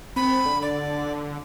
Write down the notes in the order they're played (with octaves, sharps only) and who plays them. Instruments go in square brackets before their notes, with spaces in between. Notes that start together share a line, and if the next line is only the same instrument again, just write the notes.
[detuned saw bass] C4 [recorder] B5
[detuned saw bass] D3
[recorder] D5